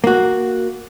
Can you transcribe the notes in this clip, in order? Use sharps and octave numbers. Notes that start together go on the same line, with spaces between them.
A#3 F#4